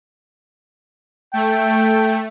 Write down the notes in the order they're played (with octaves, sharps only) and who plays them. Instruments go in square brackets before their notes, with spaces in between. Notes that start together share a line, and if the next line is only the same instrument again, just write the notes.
[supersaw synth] A3 [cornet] G5